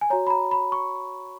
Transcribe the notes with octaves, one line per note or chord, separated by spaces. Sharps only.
G#5
F#4 C#5 A#5
B5
A#5
B5
C#6